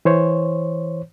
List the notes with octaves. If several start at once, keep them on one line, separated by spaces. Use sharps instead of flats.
E3 C5 C#5